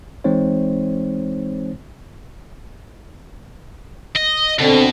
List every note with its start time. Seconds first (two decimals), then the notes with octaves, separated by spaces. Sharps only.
0.24 E3 G#3 C4 D#4 C5 C#5
4.16 D#5
4.59 B2 D3 C4